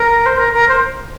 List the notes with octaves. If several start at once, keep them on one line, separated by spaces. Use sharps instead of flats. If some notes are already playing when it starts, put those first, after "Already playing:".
Already playing: A#4
C5
A#4
A#4
C5